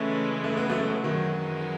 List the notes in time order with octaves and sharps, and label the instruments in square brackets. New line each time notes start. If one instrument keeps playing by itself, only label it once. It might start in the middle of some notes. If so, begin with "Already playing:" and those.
Already playing: [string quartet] C#3 E3 G#3 [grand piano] A3 C#4
[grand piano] A3
B3
F#3 A3
[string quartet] F#2 E3 G#3 D#4 [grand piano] D#3 F#3